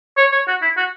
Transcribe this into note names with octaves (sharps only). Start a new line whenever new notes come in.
C#5
C#5
F#4
E4
F#4